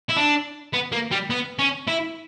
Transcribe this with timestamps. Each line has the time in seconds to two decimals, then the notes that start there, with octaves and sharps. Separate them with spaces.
0.09 E4
0.16 D4
0.73 B3
0.92 A#3
1.12 G3
1.30 B3
1.59 C#4
1.88 E4